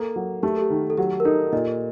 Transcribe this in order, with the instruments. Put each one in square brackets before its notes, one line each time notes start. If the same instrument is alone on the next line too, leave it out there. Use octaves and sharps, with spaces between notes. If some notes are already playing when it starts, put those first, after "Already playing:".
Already playing: [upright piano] A#3 [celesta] A4
[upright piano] F#3
[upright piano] A3 [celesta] G4
[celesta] A4
G4
[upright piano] D#3
[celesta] A4
[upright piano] F#3 [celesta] G4
[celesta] A#4
[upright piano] D#4 [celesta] A4
[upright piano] A#2 [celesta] D#5